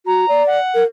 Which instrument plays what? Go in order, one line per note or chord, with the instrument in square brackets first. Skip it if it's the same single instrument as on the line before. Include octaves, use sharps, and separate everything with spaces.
[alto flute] F#4 [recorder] A#5
[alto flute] D5
[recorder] F#5
[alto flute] A#4